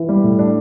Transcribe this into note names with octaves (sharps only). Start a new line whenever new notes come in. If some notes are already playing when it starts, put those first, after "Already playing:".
Already playing: E3
G3
A2
D4